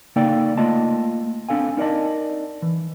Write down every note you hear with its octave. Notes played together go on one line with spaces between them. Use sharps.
C#3 A#3 D#4 A4 D5 G5
A3 A#3 F4 D#5 A5
C4 D4 A4 F5 G#5
D#4 A#4 D5 D#5 A5
E3